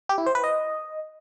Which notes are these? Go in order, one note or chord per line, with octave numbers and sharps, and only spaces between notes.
G4
E4
C5
B4
D#5